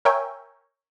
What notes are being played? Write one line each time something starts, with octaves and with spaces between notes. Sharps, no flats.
A#4 C#5 E5 G5 G#5